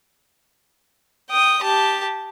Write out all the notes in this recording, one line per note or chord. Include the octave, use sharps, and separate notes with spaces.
G5 D#6
G4 A5